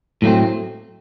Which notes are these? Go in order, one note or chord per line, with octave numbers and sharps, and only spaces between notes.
A2 F#3 A3 C4